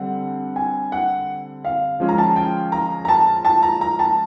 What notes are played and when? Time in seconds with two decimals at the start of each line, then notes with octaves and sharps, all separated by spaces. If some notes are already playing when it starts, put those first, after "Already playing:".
Already playing: D3 G3 C4 F#5
0.56 G#5
0.92 F#5
1.65 F5
2.00 F3 G#3 C#4 F4
2.09 A#5
2.18 A5
2.36 G5
2.72 A#5
3.05 A#5
3.08 A5
3.45 A5
3.63 A#5
3.81 A#5
3.99 A5